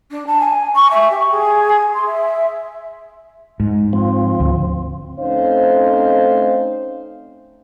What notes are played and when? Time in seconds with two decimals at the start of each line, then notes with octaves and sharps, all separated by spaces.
0.11 D4
0.27 A5
0.40 G#5
0.75 C#6
0.90 E5
1.10 G4
1.30 G#4
1.94 C6
2.06 E5
3.60 G#2
3.93 F3 C4
4.40 D2
5.20 A3 C4 C#4 D#4 C5 F5